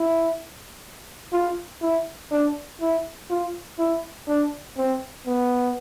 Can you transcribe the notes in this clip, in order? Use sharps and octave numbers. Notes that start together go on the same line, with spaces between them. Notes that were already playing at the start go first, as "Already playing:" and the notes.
Already playing: E4
F4
E4
D4
E4
F4
E4
D4
C4
B3